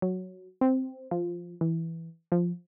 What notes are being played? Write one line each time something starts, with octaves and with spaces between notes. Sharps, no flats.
F#3
C4
F3
E3
F3